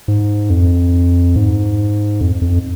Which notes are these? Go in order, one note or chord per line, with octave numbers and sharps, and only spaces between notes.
G#2
F2
G#2
F2
F2